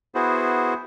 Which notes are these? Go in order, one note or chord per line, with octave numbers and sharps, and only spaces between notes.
B3 E4 F#4 G#4 C5